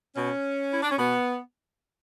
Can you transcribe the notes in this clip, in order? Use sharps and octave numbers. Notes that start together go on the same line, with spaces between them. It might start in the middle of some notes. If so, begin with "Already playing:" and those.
B2 C#4
E4
D4
C#4
B2 B3